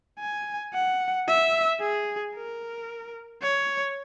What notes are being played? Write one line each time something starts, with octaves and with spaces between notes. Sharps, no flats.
G#5
F#5
E5
G#4
A#4
C#5